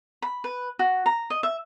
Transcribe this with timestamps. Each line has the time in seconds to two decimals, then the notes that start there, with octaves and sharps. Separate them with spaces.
0.22 B5
0.44 B4
0.79 F#4
1.06 A#5
1.30 D#5
1.43 E5